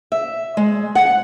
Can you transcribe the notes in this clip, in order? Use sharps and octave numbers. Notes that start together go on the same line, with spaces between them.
E5
G#3
F#5